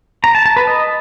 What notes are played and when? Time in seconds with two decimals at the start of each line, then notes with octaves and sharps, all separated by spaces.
0.24 A#5
0.35 A5
0.46 A5
0.56 B4
0.67 D#5